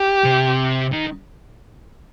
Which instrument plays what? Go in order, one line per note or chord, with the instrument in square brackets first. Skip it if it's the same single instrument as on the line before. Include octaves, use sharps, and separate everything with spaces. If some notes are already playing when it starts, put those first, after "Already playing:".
Already playing: [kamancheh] G4
[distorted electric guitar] C3
D#3